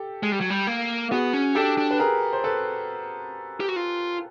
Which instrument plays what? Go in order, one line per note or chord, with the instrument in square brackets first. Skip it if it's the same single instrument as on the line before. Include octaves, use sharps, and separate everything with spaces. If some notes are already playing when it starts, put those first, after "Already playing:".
Already playing: [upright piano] G4 A4
[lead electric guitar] G#3
G3
F#3
G3
A#3
[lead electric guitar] B3 [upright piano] F#4 G#4
[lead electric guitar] C#4
[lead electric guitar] D4 [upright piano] G4 A4
[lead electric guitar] D4
[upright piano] B4
G#4 A#4
C5
A4 B4
[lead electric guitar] G4
F#4
F4